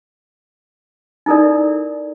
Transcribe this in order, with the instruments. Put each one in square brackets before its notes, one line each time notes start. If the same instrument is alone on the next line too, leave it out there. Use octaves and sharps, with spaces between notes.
[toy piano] D#4 E4 A4 A#4 D5